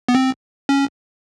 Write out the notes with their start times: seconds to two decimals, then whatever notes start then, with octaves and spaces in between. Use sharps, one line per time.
0.08 B3
0.15 C4
0.69 C#4